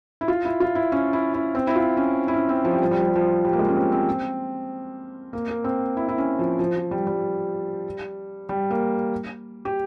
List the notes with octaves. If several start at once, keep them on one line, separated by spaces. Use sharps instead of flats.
E4
F4
E4
F4
E4
C#4
E4
E4
C4
E4
F4
C#4
E4
C#4
C4
F3
G3
F3
G3
F3
G3
F3
G3
A#3
G#3
C#4
C4
C4
A#3
A#3
C4
E4
E4
C#4
F3
F3
F3
G3
G3
G3
A#3
G4